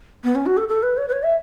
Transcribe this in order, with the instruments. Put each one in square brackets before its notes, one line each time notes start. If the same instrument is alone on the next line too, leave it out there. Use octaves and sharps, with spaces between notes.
[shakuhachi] B3
C#4
F#4
A4
A4
B4
C#5
B4
C#5
E5